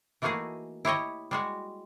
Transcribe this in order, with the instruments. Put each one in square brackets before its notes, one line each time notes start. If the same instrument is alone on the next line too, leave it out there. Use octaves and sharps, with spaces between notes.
[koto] E3 A3 A#3 D#4 F#4 G#4
E4 G4 C#5 D#5
G3 G#3 F#4